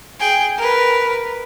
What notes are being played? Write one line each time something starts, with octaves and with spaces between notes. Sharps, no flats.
G#4 G5
A#4 B4